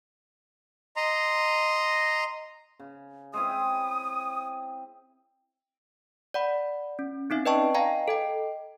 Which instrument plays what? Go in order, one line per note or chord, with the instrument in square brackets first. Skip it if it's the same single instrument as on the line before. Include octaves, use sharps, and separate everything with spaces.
[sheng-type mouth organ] D#5 A#5 C6
[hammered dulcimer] C#3
[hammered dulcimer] G#3 C4 E4 [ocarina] D#6
[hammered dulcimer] G5
[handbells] D5 F#5 B5
C#4
C4 C#4 D#4 E5
B4 D5 D#5 G5 A5 C#6
D#5 F5 G5 G#5 A#5
A4 D#5 G5